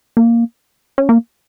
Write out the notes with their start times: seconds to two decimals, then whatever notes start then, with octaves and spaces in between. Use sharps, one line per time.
0.17 A#3
0.98 C#4
1.09 A#3